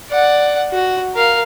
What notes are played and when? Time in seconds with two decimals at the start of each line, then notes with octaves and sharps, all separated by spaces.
0.11 D5 F#5
0.71 F#4
1.14 A#4 F5